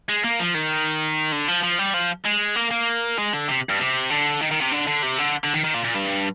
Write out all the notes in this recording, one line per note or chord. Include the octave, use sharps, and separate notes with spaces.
G#3
A#3
F3
D#3
D3
F3
F3
G3
F3
G#3
A#3
A#3
G#3
D3
C3
G2
C3
D3
D#3
D#3
C3
D3
D3
C3
D3
D3
D#3
D#3
A#2
A#2
G2